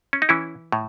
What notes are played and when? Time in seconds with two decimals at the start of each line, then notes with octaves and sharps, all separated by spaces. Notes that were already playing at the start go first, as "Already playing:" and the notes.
0.13 C#4
0.22 D#4
0.29 E3 C#4 E4
0.72 A2